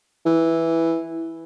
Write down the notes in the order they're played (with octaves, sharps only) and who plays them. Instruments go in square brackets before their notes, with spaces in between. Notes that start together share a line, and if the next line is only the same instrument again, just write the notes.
[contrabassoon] E3